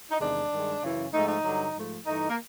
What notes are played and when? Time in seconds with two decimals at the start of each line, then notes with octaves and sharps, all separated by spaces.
0.11 D#4
0.19 E2 C3 D#3 G#3 D4
0.51 G2 D#3 G#3
0.82 F#2 C#3 E3
1.12 G#2 F3 A3 D#4
1.28 D#4
1.43 G2 D3 F#3
1.74 G#2 F3 A3
2.05 G2 E3 A3 D#4
2.29 A#3